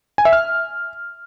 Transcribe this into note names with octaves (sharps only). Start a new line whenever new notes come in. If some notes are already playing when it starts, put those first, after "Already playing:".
G#5
E5
F6